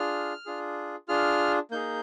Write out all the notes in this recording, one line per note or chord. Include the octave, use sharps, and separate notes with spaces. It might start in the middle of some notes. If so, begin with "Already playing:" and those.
Already playing: D4 F4 G#4 F6
D4 F4 G#4
D4 F4 G#4 F6
A#3 D#4 G#4 G6